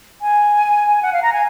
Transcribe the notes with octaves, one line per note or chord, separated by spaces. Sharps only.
G#5
F#5
F5
A#5
G#5